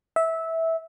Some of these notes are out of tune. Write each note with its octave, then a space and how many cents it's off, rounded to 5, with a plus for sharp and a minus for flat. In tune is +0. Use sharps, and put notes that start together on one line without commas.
E5 -15